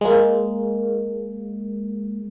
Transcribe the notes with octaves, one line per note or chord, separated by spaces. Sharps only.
G#3 A#3